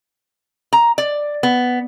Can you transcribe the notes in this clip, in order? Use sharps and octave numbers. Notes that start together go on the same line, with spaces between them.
A#5
D5
B3